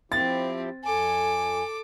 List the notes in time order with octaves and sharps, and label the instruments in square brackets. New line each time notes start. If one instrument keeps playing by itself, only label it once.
[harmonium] F3 E4 G4 [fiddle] C4 [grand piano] A6
[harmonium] F2 [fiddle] A4 D6 [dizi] G#5